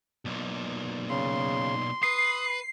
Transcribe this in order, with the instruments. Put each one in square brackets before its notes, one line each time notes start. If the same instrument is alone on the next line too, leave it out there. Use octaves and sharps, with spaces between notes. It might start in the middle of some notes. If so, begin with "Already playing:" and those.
[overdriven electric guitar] B1 A#2
[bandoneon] C#3 [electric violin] C6
[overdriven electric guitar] B4 [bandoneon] D#6 [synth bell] C7